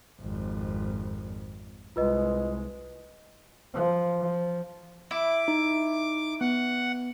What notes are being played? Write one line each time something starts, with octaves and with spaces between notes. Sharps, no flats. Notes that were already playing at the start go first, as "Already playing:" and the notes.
G#1 F2
C2 G#3 F4 B4 D#5
F3
F3
E4 D6
D#4
B3 F#5